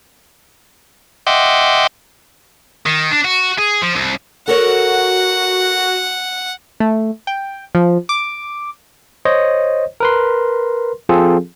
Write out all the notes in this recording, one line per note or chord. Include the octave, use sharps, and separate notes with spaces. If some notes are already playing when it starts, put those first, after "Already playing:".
D#5 E5 F#5 G5 C6 D6
D#3
D4
F#4
G#4
F3
C2
F#4 A4 A#4 C#5 F#5
A3
G5
F3
D6
C5 C#5 D#5
A#4 B4 C6
F3 C4 F4 G#4 A4